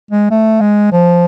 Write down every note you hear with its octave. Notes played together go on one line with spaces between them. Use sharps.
G#3
A3
G#3
F3